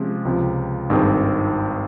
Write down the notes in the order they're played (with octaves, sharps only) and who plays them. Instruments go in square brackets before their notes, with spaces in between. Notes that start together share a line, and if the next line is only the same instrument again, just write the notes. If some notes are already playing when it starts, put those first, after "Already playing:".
Already playing: [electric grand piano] C3 F3 G#3 C#4
C#2 C3 F3
G#1 G2 D#3 G#3 C4